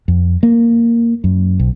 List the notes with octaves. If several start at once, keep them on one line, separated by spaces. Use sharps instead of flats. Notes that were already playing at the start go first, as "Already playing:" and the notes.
F2
A#3
F#2
B1